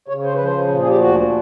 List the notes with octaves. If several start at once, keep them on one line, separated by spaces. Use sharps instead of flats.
C#3 C#5
C5
F3 B4
C5
A#2
G#4
G4
D2 F#4